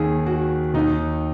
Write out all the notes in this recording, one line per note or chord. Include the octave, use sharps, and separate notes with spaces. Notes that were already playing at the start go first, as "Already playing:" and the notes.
Already playing: D#2 D#3 G#4
F#4
D#2 D#3 D#4